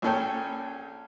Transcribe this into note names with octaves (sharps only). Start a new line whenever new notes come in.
A#1 A#2 C#4 A4 C#5 G5